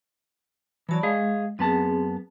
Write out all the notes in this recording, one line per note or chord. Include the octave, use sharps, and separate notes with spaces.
E3 F#3 D5 A5 B5
G#3 G#4 D#5 F5
F#2 B3 C4 G#4 A5